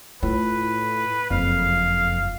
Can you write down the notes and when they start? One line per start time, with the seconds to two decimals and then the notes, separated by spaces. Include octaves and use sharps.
0.23 A2 F4 B4
1.31 F#1 F2 F5